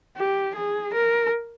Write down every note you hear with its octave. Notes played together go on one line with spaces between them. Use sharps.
G4
G#4
A#4